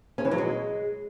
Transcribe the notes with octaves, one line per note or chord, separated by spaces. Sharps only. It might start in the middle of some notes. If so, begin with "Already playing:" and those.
C#4
E3
F#3
G#3